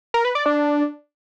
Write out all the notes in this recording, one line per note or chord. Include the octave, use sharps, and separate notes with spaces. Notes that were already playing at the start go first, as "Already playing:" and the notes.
A#4
B4
D5
D4